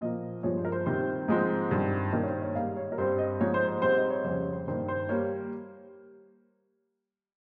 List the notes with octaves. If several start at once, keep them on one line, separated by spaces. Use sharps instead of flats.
A#2 F3 A#3 D#5
G2 F3 G#3 C#5
C5
A#4
C5
C3 D#3 G3 C4 C5
G#2 F3 G#3 C4
G2 D#3 G3 C4
G2 D#3 A#3 A#4
C#5
C5
C#5
G#2 G3 A#3 F5
C#5
A#4
G2 G3 C4 C5
D#5
G#2 F3 G#3 C#5
C5
C5
G#2 G3 C4 C5
D#5
C#5
F2 C#3 G3 C5
C#5
C5
G2 D#3 G3 A#3 C5
C5
G3 A#3 C#5